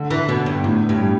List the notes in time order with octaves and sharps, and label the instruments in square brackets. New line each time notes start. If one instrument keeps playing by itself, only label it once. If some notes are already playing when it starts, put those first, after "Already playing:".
Already playing: [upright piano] D3
[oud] E3
[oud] B2 [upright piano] B3
[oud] G2
[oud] E2 [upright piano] A2
[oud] G2
[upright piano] G3